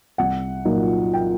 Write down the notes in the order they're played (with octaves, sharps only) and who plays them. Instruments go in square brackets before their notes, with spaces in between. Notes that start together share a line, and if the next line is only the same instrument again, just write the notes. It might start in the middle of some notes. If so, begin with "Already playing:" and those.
[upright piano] C2 F#5
A#2 F#3 A#3 D#4
G5